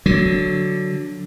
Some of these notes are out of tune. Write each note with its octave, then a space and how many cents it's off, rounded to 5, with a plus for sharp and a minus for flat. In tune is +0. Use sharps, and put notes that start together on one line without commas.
D3 +0 F#3 +0